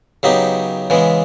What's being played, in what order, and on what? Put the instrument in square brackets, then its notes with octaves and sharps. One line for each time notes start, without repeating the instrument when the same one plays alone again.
[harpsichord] C#3 F#3 B3 D#4 G4
C#3 E3 G#3 B3